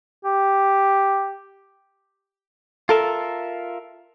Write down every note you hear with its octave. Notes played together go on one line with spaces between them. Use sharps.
G4
F4 A4 A#4 E5